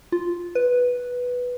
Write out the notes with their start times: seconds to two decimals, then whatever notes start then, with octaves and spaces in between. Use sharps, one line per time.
0.12 F4
0.55 B4